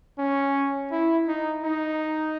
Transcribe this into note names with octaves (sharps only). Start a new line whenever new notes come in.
C#4
E4
D#4
D#4